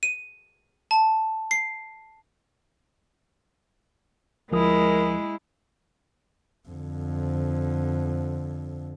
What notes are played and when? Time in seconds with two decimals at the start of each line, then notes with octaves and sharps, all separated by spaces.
0.03 D#7
0.91 A5
1.51 C7
4.52 D2 F3 G#3 E4 A#4 D#6
6.69 F2 D3